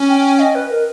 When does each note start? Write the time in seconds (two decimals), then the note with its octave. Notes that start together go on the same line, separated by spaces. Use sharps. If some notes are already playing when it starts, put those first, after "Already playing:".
Already playing: C#4
0.09 G5
0.39 D#5
0.55 B4
0.70 A#4